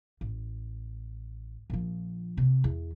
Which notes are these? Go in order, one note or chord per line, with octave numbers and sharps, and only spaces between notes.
A1
A#1 F3
C3
E2